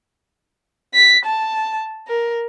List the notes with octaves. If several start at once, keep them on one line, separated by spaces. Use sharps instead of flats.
B6
A5
A#4